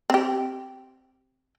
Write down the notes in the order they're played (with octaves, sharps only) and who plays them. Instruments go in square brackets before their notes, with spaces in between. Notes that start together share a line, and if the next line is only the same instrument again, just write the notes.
[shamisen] C4 G4